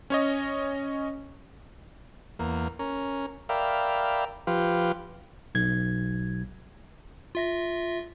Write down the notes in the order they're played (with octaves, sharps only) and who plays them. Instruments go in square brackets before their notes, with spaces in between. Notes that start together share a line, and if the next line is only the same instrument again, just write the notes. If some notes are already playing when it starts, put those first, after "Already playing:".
[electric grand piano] C#4 C#5 D#5
[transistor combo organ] E2 A#3
C#4 A#4
A#4 D5 E5 F5 G5 B5
F3 F4 G4 B4
[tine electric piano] B1 G#6
[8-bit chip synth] F4 E5 A#6